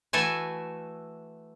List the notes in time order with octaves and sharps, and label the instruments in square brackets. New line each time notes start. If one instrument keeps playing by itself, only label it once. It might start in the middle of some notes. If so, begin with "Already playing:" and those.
[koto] E3 A3 F#4 A4 E5 G#5